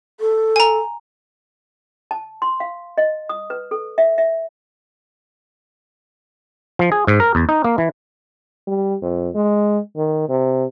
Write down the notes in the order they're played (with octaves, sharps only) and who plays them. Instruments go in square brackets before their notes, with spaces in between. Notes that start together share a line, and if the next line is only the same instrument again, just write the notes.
[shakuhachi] A4
[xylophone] G#5 A#5
[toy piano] A5
C6
F5
D#5
D#6
B4
A4
E5
E5
[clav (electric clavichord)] F3
G#4
G#2
A#4
E2
D#4
A#3
E3
[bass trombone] G3
F2
G#3
D#3
C3